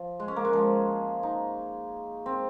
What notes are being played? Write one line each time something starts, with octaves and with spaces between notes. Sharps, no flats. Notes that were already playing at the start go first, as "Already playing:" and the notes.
Already playing: F3
G#3
C#4
A#3
G#3
F3
D#4
C4